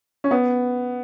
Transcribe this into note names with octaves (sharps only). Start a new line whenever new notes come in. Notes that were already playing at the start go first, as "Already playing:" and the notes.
C#4
B3